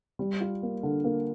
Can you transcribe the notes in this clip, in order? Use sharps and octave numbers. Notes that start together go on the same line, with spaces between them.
G3
F4
A#3
D3
A#3